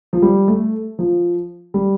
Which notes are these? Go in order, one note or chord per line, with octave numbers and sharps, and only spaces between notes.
F3
G3
A3
F3
G3